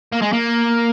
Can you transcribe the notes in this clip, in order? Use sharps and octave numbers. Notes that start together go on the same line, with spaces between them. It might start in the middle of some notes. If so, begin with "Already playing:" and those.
A#3
G#3
A#3